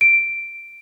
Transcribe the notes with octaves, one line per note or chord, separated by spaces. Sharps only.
D7